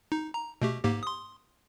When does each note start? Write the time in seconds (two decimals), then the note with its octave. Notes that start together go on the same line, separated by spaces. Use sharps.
0.12 D#4
0.34 A#5
0.62 B2 A3 G4
0.84 G#2 A#3 G4
1.03 C6 D#6